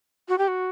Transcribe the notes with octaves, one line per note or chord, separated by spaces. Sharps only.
F#4
G4
F#4